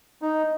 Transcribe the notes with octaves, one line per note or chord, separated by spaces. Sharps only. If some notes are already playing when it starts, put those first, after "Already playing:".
D#4